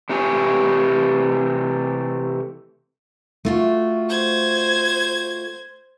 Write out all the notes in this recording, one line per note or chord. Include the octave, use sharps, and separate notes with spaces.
C3 E3 A3 G4 C#5 G#5
A3 F4 F#4
C5 G#6